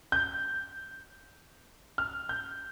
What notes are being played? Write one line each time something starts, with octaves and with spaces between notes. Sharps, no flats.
G6
F6
G6